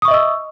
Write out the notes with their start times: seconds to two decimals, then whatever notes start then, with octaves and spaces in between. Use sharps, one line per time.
0.02 D#6
0.05 C#6
0.08 E5
0.11 D#5
0.14 E6